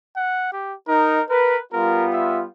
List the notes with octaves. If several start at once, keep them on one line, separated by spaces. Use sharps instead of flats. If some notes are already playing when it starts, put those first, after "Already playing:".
F#5
G4
D#4 A#4
A#4 B4
G3 B3 F4 A#4
E5